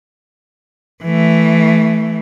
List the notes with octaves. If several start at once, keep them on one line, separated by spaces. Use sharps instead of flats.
E3 A3